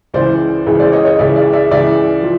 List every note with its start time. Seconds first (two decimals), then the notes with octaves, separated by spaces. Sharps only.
0.14 C#2 C#3 E3 C5 D5
0.66 C#2 C#3 E3
0.80 C5 D5
0.92 C#5 D#5
1.05 C#5 D#5
1.19 C#2 C#3 E3 D5 E5
1.36 D5 E5
1.53 D5 E5
1.71 C#2 C#3 E3 D5 E5
2.23 F3